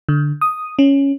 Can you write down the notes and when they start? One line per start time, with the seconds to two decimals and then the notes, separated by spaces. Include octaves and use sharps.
0.09 D3
0.41 D#6
0.79 C#4